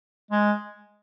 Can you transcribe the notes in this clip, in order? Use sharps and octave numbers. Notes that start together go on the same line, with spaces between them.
G#3